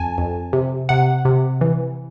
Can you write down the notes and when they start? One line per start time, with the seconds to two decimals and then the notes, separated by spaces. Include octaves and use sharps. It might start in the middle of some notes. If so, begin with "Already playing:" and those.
Already playing: F2 G#5 A5
0.18 F2
0.53 C3
0.89 C3 F#5
1.25 C3
1.61 E3